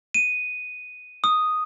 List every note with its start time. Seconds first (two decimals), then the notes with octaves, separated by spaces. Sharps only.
0.14 D#7
1.24 D#6